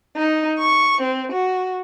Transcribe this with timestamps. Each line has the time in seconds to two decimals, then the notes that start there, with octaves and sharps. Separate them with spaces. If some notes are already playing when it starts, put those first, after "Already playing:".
0.17 D#4
0.60 C#6
1.02 C4
1.33 F#4